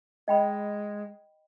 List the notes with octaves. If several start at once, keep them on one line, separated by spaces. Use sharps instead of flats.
G#3 D#5 G5 B5